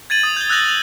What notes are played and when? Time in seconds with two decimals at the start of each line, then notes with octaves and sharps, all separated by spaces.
0.10 G#6 A6 D#7 F#7
0.23 D#6
0.37 G6 G7
0.50 E6 F#6 G6 A#6 F#7
0.69 F#7